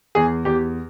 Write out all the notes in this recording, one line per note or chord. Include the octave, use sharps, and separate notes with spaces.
E2 G#4
E2 G4